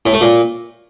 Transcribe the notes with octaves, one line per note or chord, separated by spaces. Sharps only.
A2
A3
A#2